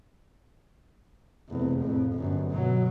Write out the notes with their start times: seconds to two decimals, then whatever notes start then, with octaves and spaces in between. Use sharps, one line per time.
1.49 F1 E2
1.80 F2 A2
2.14 G1 F#2
2.50 B2 F#3